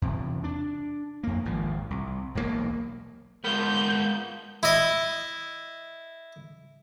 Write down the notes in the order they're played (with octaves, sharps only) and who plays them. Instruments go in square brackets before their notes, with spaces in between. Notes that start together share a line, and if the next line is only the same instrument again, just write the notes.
[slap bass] E2 C3
D4
F2 A#3
G#1 F3
C2
E1 B1 A#2 A#3
[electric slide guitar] G#3 A#4 [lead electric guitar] B3 F4 [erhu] G6
[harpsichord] E4 D#5